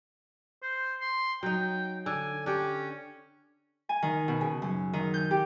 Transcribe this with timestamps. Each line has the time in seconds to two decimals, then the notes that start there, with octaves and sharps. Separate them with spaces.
0.63 C5
1.01 C6
1.43 F#3 D#4 G5
2.06 D3 G#5
2.46 C#4 D4 G4
3.89 G#5
4.03 D#3
4.28 B2
4.41 C#3
4.62 F#2
4.93 D#3
5.14 G6
5.31 G4